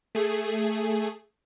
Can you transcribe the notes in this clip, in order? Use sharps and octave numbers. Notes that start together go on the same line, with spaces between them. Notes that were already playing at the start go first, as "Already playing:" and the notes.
A3 G#4